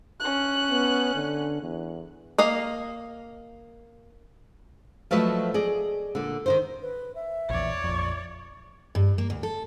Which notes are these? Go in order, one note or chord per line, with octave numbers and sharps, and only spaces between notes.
C#4 F#6
B3
D3
E2
A#3 D#5 F5
F3 F#3 A3 B4 D#5 E5
G#4 D5 D#5
A#2 D3
D#3 D#4 C5
B4
E5
A#1 E2 C#5 D5
A#1 F2 C#6
G2
A#3
D2
A4